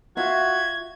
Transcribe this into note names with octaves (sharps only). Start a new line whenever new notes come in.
F4 F#4 E5 F5 G#6